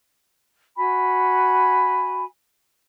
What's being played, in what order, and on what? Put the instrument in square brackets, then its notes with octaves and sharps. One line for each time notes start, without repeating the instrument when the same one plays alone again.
[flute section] F#4 G#5 B5